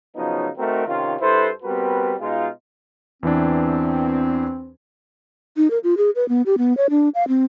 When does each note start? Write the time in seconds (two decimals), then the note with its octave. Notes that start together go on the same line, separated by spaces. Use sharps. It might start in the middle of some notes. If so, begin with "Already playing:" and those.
0.16 C#3 F3 F#3 B3 D#4
0.58 A3 C4 D#4 F#4 A#4
0.87 C3 D#3 C#4 F4
1.20 G2 E4 A4 B4 C5
1.63 G3 B3 C4 F#4 A#4 B4
2.19 B2 G#3 D#4 F4
3.23 E2 E3 C4 D4
5.57 D#4
5.71 A#4
5.84 F4
5.97 G#4
6.16 B4
6.29 B3
6.46 G4
6.58 B3
6.77 C#5
6.90 D4
7.15 F5
7.28 C4